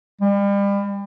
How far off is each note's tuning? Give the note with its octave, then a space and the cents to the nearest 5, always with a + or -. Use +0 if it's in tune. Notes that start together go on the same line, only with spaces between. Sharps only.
G3 +35